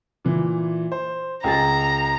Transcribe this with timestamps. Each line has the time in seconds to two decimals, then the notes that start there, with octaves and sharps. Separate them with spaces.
0.25 A#2 E3
0.92 C5
1.44 C#2 G#4 A#5 A6